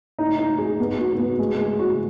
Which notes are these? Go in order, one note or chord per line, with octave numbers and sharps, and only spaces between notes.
D#4
D#4
G#4
B3
F#4
B3
G#3
G#3
F#4